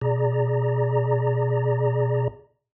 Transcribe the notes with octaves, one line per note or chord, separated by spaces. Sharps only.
B2 G#4 D5 A#5